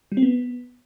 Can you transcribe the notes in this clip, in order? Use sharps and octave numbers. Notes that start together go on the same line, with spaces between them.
G3
C4
B3